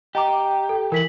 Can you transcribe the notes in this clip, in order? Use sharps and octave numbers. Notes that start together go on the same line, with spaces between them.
G4 D#5 A#5 D6
A4
E3 A#4 B6 F#7